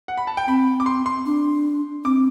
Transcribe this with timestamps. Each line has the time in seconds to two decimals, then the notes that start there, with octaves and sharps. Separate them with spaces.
0.08 F#5
0.17 B5
0.27 A5
0.37 G5
0.47 C4 B5
0.80 D6
0.86 C6
1.06 C6
1.26 D4
2.04 C4 D6